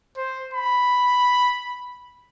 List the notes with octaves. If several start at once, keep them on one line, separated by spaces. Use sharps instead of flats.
C5
B5